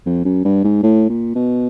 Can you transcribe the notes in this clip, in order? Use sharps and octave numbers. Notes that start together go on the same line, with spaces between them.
F2
F#2
G2
G#2
A2
A#2
B2